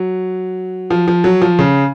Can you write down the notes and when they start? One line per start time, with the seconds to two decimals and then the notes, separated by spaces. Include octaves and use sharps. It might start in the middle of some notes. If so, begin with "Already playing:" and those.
Already playing: F#3
0.91 F3
1.08 F3
1.24 F#3
1.42 F3
1.59 C#3